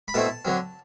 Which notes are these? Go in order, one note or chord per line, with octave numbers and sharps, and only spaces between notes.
B5
B2 A3 C4 E4 A5
D3 F#3 C4